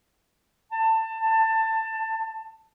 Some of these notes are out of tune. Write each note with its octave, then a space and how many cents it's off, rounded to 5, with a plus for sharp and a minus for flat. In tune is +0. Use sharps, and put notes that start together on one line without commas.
A5 +20